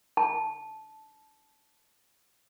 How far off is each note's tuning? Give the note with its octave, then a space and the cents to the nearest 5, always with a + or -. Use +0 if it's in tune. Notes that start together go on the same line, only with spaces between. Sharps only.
A5 -10